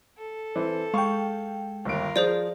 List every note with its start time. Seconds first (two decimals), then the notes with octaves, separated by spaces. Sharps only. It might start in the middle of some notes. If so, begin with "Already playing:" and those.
0.18 A4
0.56 E3 C4
0.94 G#3 F5 G5 C#6
1.85 G1 D#2 F4 A#4 D7
2.16 F3 G#4 C5 D5